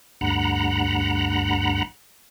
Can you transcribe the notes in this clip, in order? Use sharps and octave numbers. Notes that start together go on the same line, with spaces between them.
D2 G2 F#5 A#5 B5